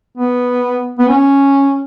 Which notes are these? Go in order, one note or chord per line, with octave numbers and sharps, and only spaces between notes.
B3
B3
C#4